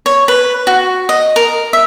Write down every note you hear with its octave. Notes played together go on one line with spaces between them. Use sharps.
C#5
B4
F#4
D#5
A#4
E5